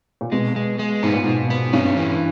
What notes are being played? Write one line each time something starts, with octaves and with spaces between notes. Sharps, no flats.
A#2
B2 G#3
G#3
G#3
G#2 B3
A#2
G#2 B2
B3
G2 C#4
E3